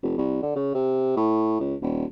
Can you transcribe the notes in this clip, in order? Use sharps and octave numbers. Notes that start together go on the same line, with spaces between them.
F1
C2
D3
C#3
C3
A2
C#2
D#1